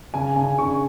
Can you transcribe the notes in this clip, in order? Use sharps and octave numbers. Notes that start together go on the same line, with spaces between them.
C#3 G#5
C#3 G#5
C#3 C#6